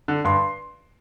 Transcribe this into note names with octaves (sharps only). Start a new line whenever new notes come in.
D3
G2 C6